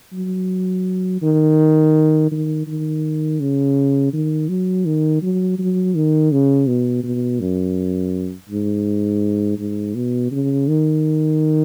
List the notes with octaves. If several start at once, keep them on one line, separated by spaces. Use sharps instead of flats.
F#3
D#3
D#3
D#3
C#3
D#3
F#3
D#3
F#3
F#3
D#3
C#3
B2
B2
F#2
G#2
G#2
B2
C#3
D#3